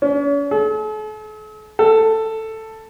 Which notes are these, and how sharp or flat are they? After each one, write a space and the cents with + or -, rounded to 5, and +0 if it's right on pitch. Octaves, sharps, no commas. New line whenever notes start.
C#4 +40
A4 -45
A4 +10